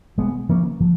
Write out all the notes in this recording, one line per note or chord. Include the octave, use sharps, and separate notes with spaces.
B2 G#3 B3
F3 A#3 C#4
F3